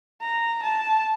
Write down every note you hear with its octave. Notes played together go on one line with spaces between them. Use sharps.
A#5
A5